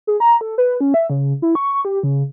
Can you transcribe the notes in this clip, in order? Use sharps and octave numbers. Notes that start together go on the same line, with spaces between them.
G#4
A#5
A4
B4
C#4
E5
C#3
E4
C#6
G4
C#3